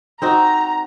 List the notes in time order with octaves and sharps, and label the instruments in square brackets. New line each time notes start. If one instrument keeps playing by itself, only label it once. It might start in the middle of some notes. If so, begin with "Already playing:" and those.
[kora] C4 D#4 F#4 [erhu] A#5